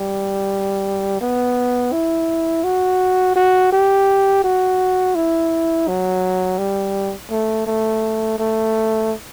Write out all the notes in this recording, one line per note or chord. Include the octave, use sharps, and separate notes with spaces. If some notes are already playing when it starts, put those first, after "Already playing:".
Already playing: G3
B3
E4
F#4
F#4
G4
F#4
E4
F#3
G3
A3
A3
A3